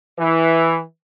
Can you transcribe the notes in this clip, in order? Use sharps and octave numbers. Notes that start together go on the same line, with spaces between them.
E3